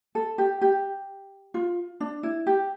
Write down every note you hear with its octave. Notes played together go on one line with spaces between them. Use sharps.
A4
G4
G4
F4
D4
E4
G4